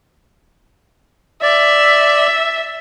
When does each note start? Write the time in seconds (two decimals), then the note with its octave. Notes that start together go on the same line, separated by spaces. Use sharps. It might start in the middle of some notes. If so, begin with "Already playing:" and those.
1.42 D5 E5